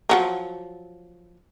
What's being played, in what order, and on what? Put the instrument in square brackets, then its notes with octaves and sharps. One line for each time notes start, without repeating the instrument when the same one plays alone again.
[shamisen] F3 F#3 A#3